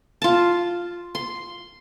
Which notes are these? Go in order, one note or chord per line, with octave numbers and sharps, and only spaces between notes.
F4 A5
C6